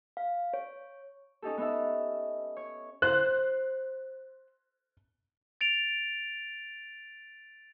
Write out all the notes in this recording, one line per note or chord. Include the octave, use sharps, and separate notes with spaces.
F5
C#5
C#4 D#4 G4 A4
B3 D#4 A4 E5
C#5
C5 F#6
A6 D7 F7